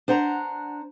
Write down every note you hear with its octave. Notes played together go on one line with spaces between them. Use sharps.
D4 C5 F#5 G#5 A#5